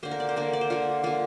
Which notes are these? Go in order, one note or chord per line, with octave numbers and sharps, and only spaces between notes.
D3 A#3 C5
A#4
D5
C5
D3 A#3 A#4
D5
C5
D3 A#3 F4
D3 A#3 F4